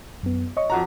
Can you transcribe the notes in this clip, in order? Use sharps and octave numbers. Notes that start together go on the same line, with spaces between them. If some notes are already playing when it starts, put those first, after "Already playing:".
F#2 B3
C#5 D#5 C#6
F2 F#4 A#5